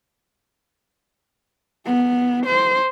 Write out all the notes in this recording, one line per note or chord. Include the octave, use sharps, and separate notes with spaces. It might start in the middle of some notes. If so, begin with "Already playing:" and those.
B3
C5